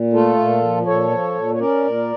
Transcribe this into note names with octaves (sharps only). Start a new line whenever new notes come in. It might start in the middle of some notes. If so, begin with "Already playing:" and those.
Already playing: A#2
A3 F4 A4
A#2
F3
A#2 A4 C#5
F3
A#2
C#5
C#4 A#4 D5
A#2